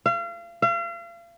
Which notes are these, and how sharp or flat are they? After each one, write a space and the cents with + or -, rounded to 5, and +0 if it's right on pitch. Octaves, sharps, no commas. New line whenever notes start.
F5 -35
F5 -40